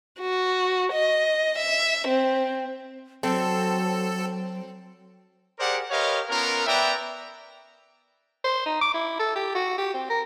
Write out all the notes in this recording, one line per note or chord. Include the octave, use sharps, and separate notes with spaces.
F#4
D#5
E5
C4
F#3 C4 A4
G4 G#4 A#4 C5 D5 F#5
G4 A#4 B4 C#5 D#5 F5
B3 C#4 F4 A#4
B3 B4 D5 E5 G5 A#5
C5
D#4
D6
E4
A4
G4
F#4
G4
C4
A#4